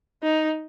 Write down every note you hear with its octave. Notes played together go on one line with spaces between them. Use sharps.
D#4